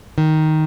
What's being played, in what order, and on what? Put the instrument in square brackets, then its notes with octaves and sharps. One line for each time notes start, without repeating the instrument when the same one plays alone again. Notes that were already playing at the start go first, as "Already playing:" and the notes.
[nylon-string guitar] D#3